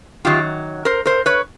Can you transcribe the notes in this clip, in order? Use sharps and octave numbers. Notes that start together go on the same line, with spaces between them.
F#2 D#3 F#3 F4 G4
A#4 C5
A#4 C5
B4 C#5